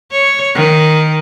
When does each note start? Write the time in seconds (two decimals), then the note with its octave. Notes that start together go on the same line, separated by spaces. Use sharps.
0.11 C#5
0.55 D#3